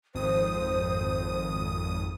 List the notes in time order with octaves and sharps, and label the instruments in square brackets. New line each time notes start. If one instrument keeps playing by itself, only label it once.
[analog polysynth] G#1 F2 D#6 [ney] C5